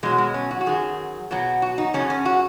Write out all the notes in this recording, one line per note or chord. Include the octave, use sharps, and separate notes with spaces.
B2 F#3 G#3
G#3
C#4
F#4
F#4
F#2 D#3 F#3 G#4
B2 F#3
F#4
D#4
F#2 C#3 F#3 C#4
C#4
F#4